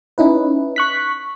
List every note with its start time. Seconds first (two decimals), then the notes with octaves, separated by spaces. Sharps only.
0.18 C#4 D#4 E4 B4
0.76 C#6 F#6 B6